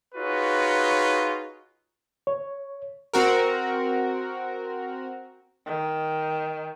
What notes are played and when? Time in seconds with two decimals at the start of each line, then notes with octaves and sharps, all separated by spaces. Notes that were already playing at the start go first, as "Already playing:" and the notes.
0.15 D#4 F4 F#4 G#4 B4 C#5
2.27 C#5
3.13 C4 F#4 A#4
5.66 D#3